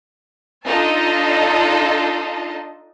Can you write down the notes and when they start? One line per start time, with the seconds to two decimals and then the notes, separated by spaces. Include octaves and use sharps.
0.67 D4 D#4 F4 A4 D#5 A5